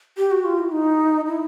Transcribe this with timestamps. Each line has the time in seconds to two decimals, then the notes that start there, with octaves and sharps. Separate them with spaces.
0.17 G4
0.31 F#4
0.45 F4
0.59 E4
0.72 D#4
1.27 E4